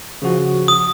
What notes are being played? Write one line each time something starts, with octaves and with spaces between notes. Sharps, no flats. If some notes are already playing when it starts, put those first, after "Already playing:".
C#3 F3 F#4
D#6